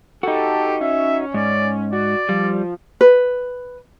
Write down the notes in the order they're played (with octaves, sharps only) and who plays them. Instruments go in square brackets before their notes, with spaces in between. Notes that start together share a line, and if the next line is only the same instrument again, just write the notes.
[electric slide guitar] D#4 F#4 [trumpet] G4 [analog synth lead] A4
[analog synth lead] C#4 [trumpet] E5
[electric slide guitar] G#2 [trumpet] D5
[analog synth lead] F#4 [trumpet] D5
[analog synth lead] F3 [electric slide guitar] G3
[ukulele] B4